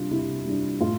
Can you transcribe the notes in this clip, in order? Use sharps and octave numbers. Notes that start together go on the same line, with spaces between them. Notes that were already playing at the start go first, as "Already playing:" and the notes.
Already playing: C3 G3 D4 F4
C3 E4
G3 D4
A2 F4